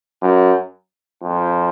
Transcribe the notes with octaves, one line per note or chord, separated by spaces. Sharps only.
F#2
F2